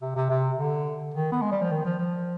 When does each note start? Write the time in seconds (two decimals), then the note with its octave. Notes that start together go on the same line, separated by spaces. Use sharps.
0.02 C3
0.16 C3
0.30 C3
0.58 D3
1.14 D#3
1.32 B3
1.42 G#3
1.51 G3
1.61 F3
1.71 D#3
1.85 F3
1.99 F3